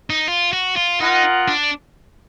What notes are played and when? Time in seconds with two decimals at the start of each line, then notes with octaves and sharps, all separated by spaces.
0.10 D#4
0.28 F4
0.53 F#4
0.76 F4
1.00 D#4 F4 A#4 D#5 F#5
1.48 D4